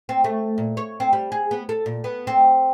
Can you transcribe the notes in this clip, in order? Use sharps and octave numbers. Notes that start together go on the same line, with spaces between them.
C4
A3
A#2
C#5
C4
G3
G#4
B3
A4
A#2
B3
C4